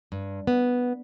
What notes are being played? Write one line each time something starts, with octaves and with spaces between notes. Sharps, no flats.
G2
B3